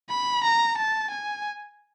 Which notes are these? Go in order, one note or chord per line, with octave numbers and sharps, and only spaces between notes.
B5
A#5
A5
G#5